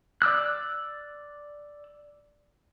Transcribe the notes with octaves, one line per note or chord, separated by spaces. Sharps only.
D5 D6 E6 F#6